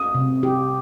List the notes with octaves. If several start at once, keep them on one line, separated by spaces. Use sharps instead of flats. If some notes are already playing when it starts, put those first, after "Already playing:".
Already playing: D#6
C3
G4